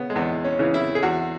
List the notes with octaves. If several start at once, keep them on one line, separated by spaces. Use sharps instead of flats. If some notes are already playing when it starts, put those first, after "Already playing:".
Already playing: C#3 B3 C#4
G#3
E2 B3
C#4
C#3 E3
E4
G#4
E2 F#4